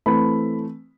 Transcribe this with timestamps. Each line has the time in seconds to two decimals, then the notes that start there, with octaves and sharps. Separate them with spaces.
0.06 E3 A3 C4 B5